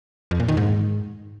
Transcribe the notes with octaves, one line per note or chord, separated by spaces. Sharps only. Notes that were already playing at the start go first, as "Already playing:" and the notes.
F2
A#2
D#3
G#2